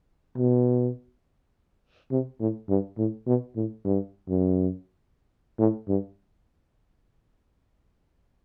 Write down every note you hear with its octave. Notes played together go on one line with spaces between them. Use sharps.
B2
C3
A2
G2
A2
B2
A2
G2
F#2
A2
G2